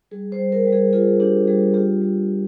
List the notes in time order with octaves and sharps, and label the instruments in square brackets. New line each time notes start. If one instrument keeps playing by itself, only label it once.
[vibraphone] G3 G#4
C5
G3
A#4
G3
G#4
F4 G#4
D4 G4
G3 G#4
F4 G4
G3
F4